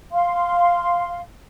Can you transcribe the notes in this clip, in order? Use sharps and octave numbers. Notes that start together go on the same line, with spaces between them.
F5 C6